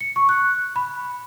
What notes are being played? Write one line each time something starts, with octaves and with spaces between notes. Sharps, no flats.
C#7
C#6
F#6
B5